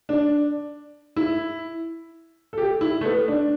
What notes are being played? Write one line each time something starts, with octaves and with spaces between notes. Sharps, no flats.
D4
E4
A4
G4
E4
A3
B3
D4